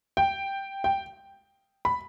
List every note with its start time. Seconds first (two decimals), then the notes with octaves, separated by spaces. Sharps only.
0.17 G5
0.84 G5
1.85 B5